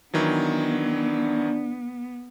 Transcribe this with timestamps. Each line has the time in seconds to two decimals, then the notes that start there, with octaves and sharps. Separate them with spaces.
0.14 D#3 E3 F#3 B3 D4